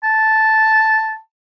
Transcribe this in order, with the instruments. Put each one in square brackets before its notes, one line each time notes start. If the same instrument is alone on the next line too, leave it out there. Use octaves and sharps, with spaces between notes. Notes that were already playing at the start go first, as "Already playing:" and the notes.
[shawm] A5